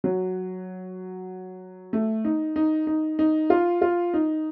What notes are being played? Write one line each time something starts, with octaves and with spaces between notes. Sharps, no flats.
F#3
A3
D#4
D#4
D#4
D#4
F4
F4
D#4